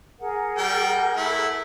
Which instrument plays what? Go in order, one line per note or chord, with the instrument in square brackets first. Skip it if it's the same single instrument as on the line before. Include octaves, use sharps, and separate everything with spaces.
[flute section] G#4 A#4 F#5
[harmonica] G3 G5
A3 E4